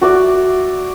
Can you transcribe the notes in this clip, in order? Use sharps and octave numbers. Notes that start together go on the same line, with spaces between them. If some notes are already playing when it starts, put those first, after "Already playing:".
F#4 D5 E5